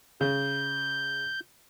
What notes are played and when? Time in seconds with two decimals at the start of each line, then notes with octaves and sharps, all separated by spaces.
0.21 C#3 G6